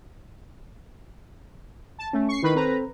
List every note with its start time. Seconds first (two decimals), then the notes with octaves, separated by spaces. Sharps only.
1.99 A5
2.13 A3 C#4
2.28 C#6 C7
2.43 D#3 E4 B4 B5
2.55 C4 A4 B4 C5 A#5